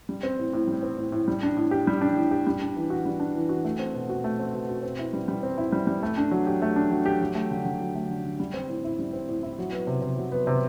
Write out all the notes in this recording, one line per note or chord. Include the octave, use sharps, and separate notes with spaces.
G3
C4
A2
A2
G3
C4
A2
A2
G3
D4
A2
G4
G3
D4
A2
G4
G3
D4
E3
F#4
G3
D4
E3
F#4
A3
C4
B2
F#4
A3
C4
B2
F#4
C4
E4
G3
G3
C4
E4
G3
G3
A3
D4
F#3
G4
A3
D4
F#3
G4
F#3
A3
D3
D3
F#3
A3
D3
D3
G3
C4
A2
E4
G3
C4
A2
E4
F#3
B3
C3
C3
F#3
B3
C3